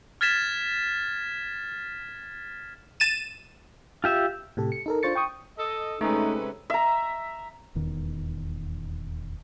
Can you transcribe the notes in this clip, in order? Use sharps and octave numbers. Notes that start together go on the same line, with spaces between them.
F6 G#6 A6 B6 E7
A6 D#7 E7
F4 G4 E5
A2 C3 G4 A4
C#7
D#4 A4 A#4
D4 F4 C5 C#6 A6 C#7
G5 C#6 D#6
A4 D#5
C3 G#3 A3 C#4 D#4 A4 B4
E5 A#5
D#1 E2 D#3